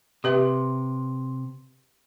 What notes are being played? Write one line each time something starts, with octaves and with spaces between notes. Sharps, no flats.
C3 G4 B4 E5